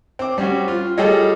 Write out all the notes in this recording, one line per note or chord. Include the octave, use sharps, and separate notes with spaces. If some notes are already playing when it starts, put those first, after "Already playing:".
C4 D6
G3 C4 C#4 F#4
F4
G3 F4 G#4 A4 C#5 D#5